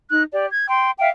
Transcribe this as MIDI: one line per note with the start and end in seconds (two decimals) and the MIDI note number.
0.10 0.23 63
0.10 0.23 90
0.31 0.46 67
0.31 0.46 74
0.51 0.67 92
0.68 0.91 79
0.68 0.91 84
1.00 1.08 76
1.00 1.08 77
1.00 1.08 79